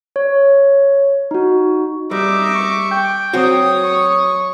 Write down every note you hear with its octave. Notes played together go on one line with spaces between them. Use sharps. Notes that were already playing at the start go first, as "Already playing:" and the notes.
C#5
D#4 F#4
G3 D#4 E5 D6
C#6
G5
F#3 C4 F#4 C#5 D#6
C#6